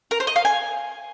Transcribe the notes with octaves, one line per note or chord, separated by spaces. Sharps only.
A#4
C5
D#5
F5
G#5